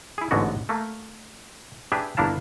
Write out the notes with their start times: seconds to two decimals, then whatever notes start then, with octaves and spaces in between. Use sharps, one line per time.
0.18 E4 G#4
0.31 A1 G#2 D3 G#3 B3 F#4
0.69 A3 A#3
1.92 D4 G4 G#4 B4 E5
2.17 G1 A#3 D4 E4 F5 A5